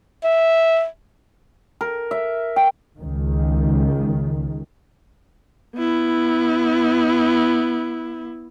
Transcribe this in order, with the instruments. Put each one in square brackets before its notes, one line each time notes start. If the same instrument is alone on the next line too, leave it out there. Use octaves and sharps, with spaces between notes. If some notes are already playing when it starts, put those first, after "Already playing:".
[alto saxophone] E5
[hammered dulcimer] A#4
E5
G5
[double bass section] C#2 D#3
[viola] B3 E4